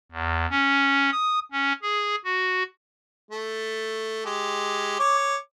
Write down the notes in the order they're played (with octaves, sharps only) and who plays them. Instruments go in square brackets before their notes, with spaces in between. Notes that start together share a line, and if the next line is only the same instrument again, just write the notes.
[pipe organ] E2
C#4
D#6
C#4
G#4
F#4
[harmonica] A3
G#3 G4
C#5 D6